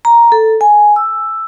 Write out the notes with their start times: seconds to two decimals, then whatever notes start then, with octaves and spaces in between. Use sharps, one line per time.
0.05 A#5
0.32 A4
0.61 G#5
0.96 E6